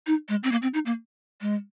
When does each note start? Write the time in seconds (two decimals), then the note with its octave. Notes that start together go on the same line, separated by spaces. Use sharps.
0.07 D#4
0.29 G#3
0.44 C4
0.52 A#3
0.62 C4
0.74 D#4
0.86 A#3
1.41 G#3